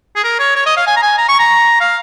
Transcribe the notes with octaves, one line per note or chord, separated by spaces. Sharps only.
G#4
A#4
C#5
C#5
D#5
F5
G#5
A#5
G#5
A#5
C#6
A#5
F5